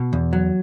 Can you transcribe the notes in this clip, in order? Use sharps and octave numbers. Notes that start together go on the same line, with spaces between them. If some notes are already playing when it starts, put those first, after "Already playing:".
Already playing: B2
E2
F#3